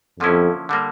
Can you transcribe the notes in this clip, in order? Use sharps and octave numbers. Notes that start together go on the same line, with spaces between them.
F2 D3 F3 A#3 C#4 E4
D3 G3 A#3